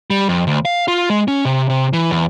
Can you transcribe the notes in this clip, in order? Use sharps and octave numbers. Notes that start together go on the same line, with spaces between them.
G3
F2
D2
F5
F4
G#3
C#4
C3
C3
E3
E2